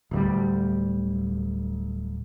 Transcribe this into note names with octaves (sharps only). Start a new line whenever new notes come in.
D1 D2 G3